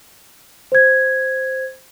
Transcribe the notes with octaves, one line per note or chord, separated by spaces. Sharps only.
C5 G#6